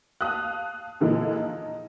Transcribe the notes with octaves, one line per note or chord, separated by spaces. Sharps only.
F5 A5 D#6 F#6
A#2 D3 E3 F3 G#3
D#4